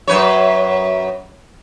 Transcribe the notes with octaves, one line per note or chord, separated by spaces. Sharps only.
F#2 B4 C#5